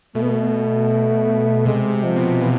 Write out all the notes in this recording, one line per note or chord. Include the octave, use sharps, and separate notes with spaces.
B2 A3
B3
A3
C3 G#3
C3
F3
B2
B2 E3